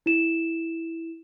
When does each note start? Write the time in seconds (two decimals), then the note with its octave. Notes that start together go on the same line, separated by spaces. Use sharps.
0.06 E4 E7